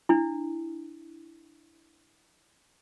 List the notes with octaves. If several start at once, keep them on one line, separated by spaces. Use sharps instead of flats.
D4 E4